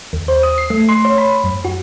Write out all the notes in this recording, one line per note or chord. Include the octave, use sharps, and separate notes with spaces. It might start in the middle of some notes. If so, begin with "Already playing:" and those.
D#2
C5
D#6
C7
A3
C6
C#5
B5
F#2
F#4